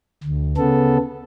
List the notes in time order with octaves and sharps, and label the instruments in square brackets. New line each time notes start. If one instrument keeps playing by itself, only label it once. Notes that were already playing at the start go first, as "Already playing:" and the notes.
[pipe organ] D2
C#3 B3 A4